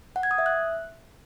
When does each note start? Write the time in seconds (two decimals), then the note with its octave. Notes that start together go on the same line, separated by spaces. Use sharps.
0.16 F#5
0.23 G#6
0.31 D#6
0.38 E5
0.46 F#6